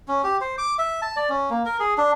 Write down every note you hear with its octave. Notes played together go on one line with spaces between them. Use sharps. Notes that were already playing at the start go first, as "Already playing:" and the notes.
C#4
G4
C5
D6
E5
A5
D5
C#4
A#3
A#4
G#4
D4